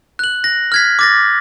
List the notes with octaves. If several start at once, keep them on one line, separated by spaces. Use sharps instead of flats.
F#6 F#7
A#6
F6 G#6 B6
D6 A6 A#6